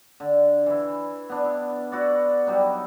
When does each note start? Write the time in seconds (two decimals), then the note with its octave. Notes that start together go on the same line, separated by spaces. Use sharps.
0.20 D3
0.66 E3 E4
1.29 B3 D4
1.44 E4
1.92 E4 F#4 D5
2.46 F#3 G3 D#4 E4